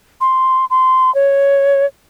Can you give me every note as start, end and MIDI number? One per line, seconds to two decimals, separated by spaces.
0.21 0.65 84
0.70 1.13 84
1.15 1.86 73